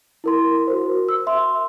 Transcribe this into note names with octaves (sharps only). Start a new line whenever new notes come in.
E4 A#4 C6
F#4 A#4 C5
E6
E5 C6